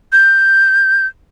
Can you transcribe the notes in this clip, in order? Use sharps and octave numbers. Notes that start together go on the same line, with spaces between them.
G6